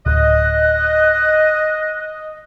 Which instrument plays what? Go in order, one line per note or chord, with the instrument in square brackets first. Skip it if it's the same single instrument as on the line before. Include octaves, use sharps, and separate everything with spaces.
[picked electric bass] D1 [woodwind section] D#5 [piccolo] F#6